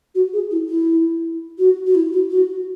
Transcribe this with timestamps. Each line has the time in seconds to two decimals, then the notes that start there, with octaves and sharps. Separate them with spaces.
0.14 F#4
0.33 G#4
0.50 E4
0.68 E4
1.58 F#4
1.86 F#4
1.94 E4
2.12 F#4
2.30 F#4